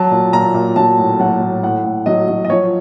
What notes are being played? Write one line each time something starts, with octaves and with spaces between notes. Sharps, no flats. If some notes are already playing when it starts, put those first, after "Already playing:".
Already playing: F#3 A5
A#2
A#2 A#5
A#2
F#3 A5
A2
F#3 F#5
A2
A2 F#5
A2
F#3 D#5
F#3
D#5
F3 C#5